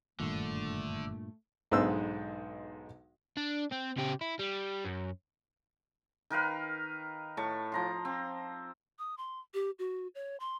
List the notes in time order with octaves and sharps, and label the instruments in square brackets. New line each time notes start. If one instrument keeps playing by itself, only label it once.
[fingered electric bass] F#1 D#3 [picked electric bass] G2 A#2 [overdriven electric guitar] D3 [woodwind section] A3
[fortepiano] B1 G#2 D3 B3 C5 E6
[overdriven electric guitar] D4
C4
C#3 G4
E4
G3
F#2
[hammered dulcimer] D#3 A#4 B4 F5
A2 A5 C#6
F3 A#5 C6
C4
[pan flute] D#6
C6
G4
F#4
C#5
C6